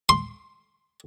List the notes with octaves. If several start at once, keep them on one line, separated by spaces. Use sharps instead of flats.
C6